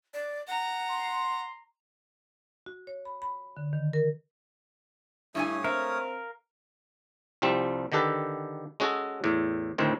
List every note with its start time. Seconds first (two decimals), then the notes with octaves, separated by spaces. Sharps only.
0.14 D5
0.48 F#5 A#5
0.88 C6
2.66 F#4
2.87 C#5
3.05 B5
3.22 B5
3.57 D3
3.73 D#3
3.93 A#4
5.35 G2 A3 C#4 E4 C#5 G#5 D#6
5.64 C4 A#4 E5 F5
7.42 C2 F3 G3 C4
7.92 D3 D#3 G4 A4 B4
8.80 G#3 C#4 F#4 G#4 A4
9.24 E2 A2
9.78 D2 A2 D#3 C4